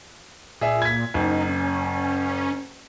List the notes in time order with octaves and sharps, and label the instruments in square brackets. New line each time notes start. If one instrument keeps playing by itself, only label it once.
[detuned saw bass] A#2 [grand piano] G#4 D5 E5
[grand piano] G#6 B6
[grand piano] F#1 [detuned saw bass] D#4
[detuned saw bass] C#4